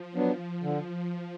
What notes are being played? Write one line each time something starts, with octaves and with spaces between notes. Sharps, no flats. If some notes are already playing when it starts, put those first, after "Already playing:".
Already playing: F3
F#3 B3 D4
D3